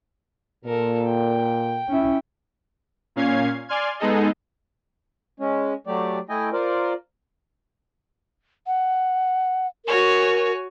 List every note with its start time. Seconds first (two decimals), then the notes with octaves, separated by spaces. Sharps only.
0.65 A#2 A4 A#4
1.04 G5
1.88 C#4 E4
3.16 A#2 C#4 F5 G#6 C7
3.68 D5 G#5 C6 F6 G#6
3.99 G#3 B3 D#4 G#4 A4 D#5
5.40 G#3 C#4
5.87 F#3 A3 G4 D5
6.29 A3 E4 D#5 G5 G#5
6.53 F4 A#4 C5 D5
8.67 F#5
9.85 F#4 A#4 C#5 G#5